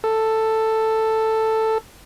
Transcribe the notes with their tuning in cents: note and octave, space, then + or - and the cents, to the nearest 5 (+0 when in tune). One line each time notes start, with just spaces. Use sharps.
A4 +5